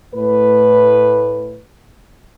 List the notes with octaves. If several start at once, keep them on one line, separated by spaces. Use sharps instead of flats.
A2 B4